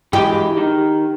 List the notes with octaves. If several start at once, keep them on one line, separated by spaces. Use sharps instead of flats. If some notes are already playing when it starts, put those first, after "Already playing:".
E3 G#3 G4
D#3